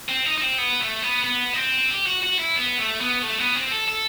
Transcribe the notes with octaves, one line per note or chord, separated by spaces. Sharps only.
C4
D#4
D#4
C4
B3
A3
B3
B3
D#4
C4
G4
F#4
F#4
E4
B3
A3
B3
A3
B3
C4
A4
A4